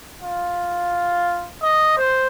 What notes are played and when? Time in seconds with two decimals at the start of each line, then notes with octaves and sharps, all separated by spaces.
0.22 F4
1.63 D#5
1.97 C5